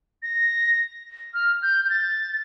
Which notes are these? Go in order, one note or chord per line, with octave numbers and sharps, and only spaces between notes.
A#6
F6
G6
G6
A6